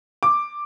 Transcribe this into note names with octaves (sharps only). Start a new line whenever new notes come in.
D6